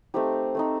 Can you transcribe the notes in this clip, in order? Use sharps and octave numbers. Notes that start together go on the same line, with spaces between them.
A3 C4 D#4 G4
A3 C4 D#4